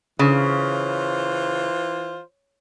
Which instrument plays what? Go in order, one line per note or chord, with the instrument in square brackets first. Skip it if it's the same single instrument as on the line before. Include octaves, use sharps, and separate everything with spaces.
[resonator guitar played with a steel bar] C#3 [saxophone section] E3 F4 C5